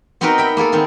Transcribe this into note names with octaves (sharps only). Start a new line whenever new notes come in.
B3 C4 D#4 F#4 A#4 B4
E5 G5 B5
A#3 B3 G#4 A4
D#3 B3 C4